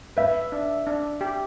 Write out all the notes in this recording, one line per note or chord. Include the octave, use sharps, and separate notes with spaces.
B4 E5
D4
D4
G4